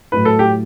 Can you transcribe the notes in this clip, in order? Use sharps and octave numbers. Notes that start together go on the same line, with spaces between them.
A2 F#3 A3 E4 B4
A4
G4